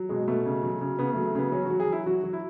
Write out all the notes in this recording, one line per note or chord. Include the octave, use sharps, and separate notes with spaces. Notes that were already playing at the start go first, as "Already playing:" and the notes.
Already playing: F#3
B2 G#3
B2 A3
C#3
F#3
C#3
C#3 B3
F#3 A3
A3
C#3 B3
F#3 C#4
F#4
F#3
G#4
F#3 E4
F#3 F#4
F#3
E4